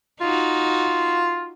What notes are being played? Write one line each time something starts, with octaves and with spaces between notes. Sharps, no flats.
D#4 F4 F#4